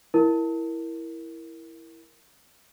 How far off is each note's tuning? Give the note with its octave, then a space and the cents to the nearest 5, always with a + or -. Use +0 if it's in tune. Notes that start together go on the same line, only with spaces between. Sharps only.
E4 +0 A#4 +0